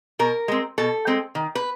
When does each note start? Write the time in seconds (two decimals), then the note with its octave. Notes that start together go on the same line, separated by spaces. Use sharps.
0.19 B2 A#4
0.48 G#3 C4
0.78 B2 A4
1.07 G#3 C4
1.35 D#3
1.55 B4